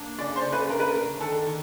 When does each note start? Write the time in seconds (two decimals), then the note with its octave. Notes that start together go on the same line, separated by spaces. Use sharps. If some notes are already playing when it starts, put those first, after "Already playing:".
Already playing: A#3 D4
0.18 C#3 D5
0.36 C5
0.44 C#3
0.52 B4
0.69 D4 A#4
0.79 B4
0.88 A#4
0.95 D4
1.20 D#3 A4
1.46 D#3